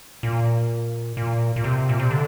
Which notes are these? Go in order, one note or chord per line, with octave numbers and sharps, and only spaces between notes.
A#2
A#2
A#2
C3
A#2
C3
D3